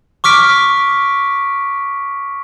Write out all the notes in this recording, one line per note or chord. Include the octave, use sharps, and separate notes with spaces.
C#6 D6 F6 B6 D7